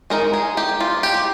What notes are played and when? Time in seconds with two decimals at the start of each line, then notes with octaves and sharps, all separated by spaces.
0.10 G#3 D#4 A#4
0.33 G#4
0.57 G4
0.80 F4
1.03 G4